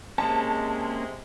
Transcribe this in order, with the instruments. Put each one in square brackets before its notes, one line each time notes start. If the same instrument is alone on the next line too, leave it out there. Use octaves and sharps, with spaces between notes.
[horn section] C3 G#3 [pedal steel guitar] A#3 C#4 [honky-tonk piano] A5